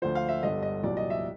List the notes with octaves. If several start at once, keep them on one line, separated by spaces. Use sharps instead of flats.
D2 D3 F3 C5
F5
E5
G1 G2 D3 D#5
D#5
C2 A#2 F#3 D5
D#5
E5